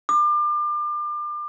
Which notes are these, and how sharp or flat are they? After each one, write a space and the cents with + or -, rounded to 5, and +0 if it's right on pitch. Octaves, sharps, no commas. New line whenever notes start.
D6 +35